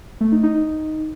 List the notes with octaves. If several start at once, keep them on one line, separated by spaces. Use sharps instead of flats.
A3
D#4
D#4